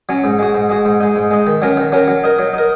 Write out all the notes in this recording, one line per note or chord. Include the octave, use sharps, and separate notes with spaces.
F#3 C#4
G#2
G#3 F#4
G#2
G#3 F#4
G#2
G#3 D#4
G#2
G#3 D#4
D#3
F#3 C#4 A#4
D#3
F#3 C#4 A#4
F#3
D#4 A#4
F#3
D#4 A#4